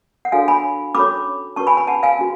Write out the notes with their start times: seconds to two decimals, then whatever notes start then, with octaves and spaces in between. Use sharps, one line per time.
0.25 F#5
0.32 D4 F#4 A4 C#5 F5 G#5
0.48 G#5 B5
0.94 C#4 F#4 A4 C#5 B5 D6
1.56 C#4 F#4 B4 A5 C#6
1.67 G#5 B5
1.77 G#5 B5
1.87 F#5 A5
2.03 F5 G#5
2.19 C#4 F#4